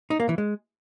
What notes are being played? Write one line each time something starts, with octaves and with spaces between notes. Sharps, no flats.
D#4
A#3
E3
G#3